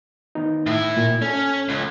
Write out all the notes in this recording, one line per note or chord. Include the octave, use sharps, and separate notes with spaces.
D#3 B3 D#4
A2 E4
A#2
C#4 A4
C#2